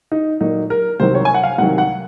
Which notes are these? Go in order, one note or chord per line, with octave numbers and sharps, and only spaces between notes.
D#4
A#2 F#3 A#3 D#4
A#4
C2 C3 D#3 F#3 C5
C#5
G#5
F#5
F5
C2 C3 D#3 F#3 F#5
F#5